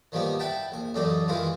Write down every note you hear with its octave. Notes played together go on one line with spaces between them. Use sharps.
D#3 F3 G3 A#3 B3
E4 E5 F#5 G5 A5
A#1 G#5
A1 F#2 A2 D#4 A4 D5
D#3 E3 G#3 E4 F4